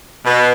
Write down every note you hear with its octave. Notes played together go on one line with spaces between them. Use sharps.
B2